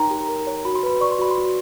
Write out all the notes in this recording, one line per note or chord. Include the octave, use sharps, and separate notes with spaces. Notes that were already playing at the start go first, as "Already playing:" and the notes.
Already playing: D#4 A#4 C#5 G5 A#5 C6
G4
A#4
C#5
F#4 B5
C6
B4 B5
D5 C#6
C6
F#4 B5
C6
F#4